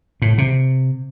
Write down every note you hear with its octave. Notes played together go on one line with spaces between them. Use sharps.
A2
C3